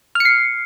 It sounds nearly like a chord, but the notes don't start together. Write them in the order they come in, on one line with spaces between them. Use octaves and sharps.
F6 C#7 C7